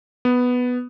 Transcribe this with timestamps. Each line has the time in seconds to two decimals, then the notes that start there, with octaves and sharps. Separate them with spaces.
0.25 B3